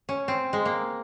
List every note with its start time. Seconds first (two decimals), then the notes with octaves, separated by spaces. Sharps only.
0.09 C#4
0.28 C4
0.53 G#3
0.66 A#3